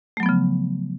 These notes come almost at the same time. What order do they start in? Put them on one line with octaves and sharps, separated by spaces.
A3 F#3 B3 F3 C#3